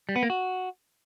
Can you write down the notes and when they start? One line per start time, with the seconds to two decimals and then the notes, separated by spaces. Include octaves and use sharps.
0.09 G3
0.16 B3
0.23 A#3
0.30 F#4